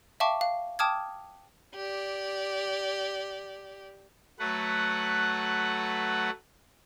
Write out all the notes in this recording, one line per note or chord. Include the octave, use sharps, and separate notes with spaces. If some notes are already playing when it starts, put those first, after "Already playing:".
E5 F5 G5 A5 C#6 D6
F5
G5 A5 D6 D#6 F6 G#6
G4 D5
F#3 A3 B4 F#5